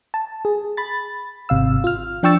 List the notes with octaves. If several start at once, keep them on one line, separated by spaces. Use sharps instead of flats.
A5
G#4
B5 A6
G#1 C3 F5 E6
F4 F6
F3 D4 G5 C#6 E6 A6